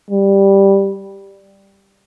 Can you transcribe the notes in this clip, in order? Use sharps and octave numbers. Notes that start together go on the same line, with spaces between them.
G3